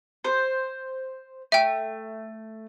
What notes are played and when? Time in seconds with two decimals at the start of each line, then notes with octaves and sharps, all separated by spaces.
0.24 C5
1.52 A3 E5 G5